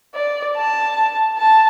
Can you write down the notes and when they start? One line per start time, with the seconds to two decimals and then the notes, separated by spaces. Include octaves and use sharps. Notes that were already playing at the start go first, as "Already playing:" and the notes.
0.14 D5
0.56 A5
1.38 A5